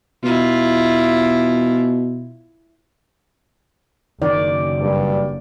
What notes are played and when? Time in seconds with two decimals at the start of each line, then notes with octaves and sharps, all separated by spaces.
0.24 B2 E4 F4
4.22 F#1 D#3 D5
4.81 G2